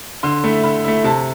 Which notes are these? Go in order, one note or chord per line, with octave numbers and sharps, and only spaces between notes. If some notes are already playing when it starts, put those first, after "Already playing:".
D3 C6
A3 E4
D3 B5
A3 E4
C3 A5